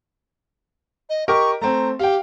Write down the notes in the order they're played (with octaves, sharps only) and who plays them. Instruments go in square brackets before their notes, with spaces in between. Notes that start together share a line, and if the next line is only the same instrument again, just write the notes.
[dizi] D#5
[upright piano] G4 A#4 D#5 [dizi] C#6
[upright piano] A3 C4 [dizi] A#5
[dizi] G4 [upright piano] F5 G5